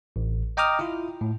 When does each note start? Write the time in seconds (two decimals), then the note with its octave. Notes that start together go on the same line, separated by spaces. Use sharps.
0.16 A1
0.57 D#5 G5 A#5 D6 D#6 F6
0.79 E4 F4
1.21 A2